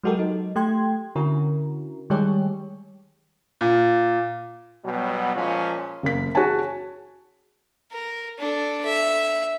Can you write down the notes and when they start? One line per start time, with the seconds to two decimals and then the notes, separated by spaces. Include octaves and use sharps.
0.03 F#3 G#3 F#4 G4 A4 A#4
0.15 F#3 D#4
0.56 A3 G4 G5 C6 G#6
1.16 D3 C#4 E4 F#4 A#4
2.10 D#3 G3 G#3 G4 G#4 C#5
3.61 A#2
4.83 B2 F#3 G3 B3
5.35 A#2 F3 G#3 C#4
6.03 F#1 A#3 B6
6.35 F#4 G#4 C#5 G#5 A5
7.92 A#4
8.38 D4 A4
8.85 E5